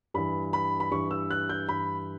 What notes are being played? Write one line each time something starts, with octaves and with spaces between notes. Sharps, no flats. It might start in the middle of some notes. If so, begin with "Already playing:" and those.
G2 E3 B5
B5
B5
G2 E3 C#6
E6
F#6
G6
G2 E3 B5